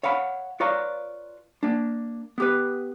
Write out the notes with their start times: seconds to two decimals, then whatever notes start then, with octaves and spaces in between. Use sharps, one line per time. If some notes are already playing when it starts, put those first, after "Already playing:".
0.03 C#5 F5 F#5 B5
0.60 F4 B4 C#5 D5 F5 A#5
1.63 A#3 D4
2.38 B3 G4 B4